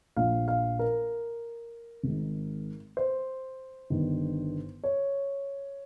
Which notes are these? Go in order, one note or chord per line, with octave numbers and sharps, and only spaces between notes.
A#1 A#2 F3 F5
F5
A#4
G#1 G#2 D#3
C5
G1 G2 D#3
C#5